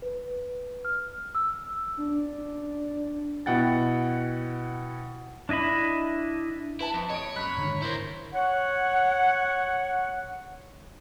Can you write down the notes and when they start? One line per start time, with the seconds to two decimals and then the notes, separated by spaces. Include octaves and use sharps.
0.02 B4
0.85 F6
1.35 E6
1.97 D4
3.46 B2 E4 F#5 G5 A6
5.49 D4 E4 D#5 E5 B5
6.80 E4 B4 A5
6.93 F2
7.10 C#5 D#5 D#6 D7
7.36 F#2 B5 F#6
7.57 G#2 D3 D#3
7.82 E4 A#4 C5
8.34 C#5 F#5